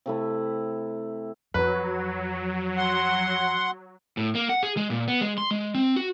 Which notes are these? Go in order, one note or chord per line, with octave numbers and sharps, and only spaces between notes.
C3 A3 E4
F2 F#3 B4
F#5 C6
A2
A#3
F#5
G#4
G#3
A#2
B3
G#3
C6
G#3
C4
F#4